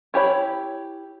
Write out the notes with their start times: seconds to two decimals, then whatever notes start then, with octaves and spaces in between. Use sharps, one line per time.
0.14 E4 G4 C#5 B5